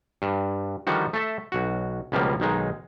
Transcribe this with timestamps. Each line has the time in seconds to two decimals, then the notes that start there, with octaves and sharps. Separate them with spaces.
0.22 G2
0.87 D3 D#3 F3 G3 F#4
1.13 A3 A4 E5
1.52 B1 F#4
2.12 C#2 B2 F3 G3 A#3
2.40 B1 D#3 G#3 D#4